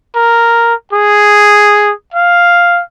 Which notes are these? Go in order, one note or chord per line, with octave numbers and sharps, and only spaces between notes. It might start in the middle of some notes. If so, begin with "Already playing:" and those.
A#4
G#4
F5